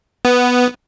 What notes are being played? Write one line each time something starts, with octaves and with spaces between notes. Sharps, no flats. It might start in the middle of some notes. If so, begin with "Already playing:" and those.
B3